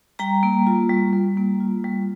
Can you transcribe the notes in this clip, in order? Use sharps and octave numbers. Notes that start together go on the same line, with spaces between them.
G3 G5 A#5
A#3
F4
G3
G3
A#3
F4
G3